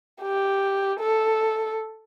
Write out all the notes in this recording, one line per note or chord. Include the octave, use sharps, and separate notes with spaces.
G4
A4